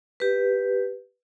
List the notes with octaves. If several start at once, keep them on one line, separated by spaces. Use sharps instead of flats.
G4 B4